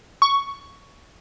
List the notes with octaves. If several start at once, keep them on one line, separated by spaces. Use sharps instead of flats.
C#6